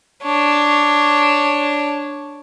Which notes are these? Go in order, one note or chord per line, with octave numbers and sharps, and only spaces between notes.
D4 C#5